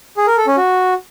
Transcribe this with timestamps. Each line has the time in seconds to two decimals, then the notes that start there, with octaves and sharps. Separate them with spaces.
0.17 G#4
0.27 A#4
0.37 A4
0.47 C#4
0.57 F#4